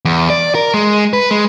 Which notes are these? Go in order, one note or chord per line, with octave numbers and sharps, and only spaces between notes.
E2
D5
A#4
G#3
B4
G#3